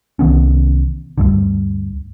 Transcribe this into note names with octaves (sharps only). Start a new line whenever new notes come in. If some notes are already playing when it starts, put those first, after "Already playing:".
C2 D#3 B3 C#4
D2 G2 D3